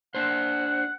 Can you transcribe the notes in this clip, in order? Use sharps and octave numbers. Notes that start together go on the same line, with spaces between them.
D4 C5 F#5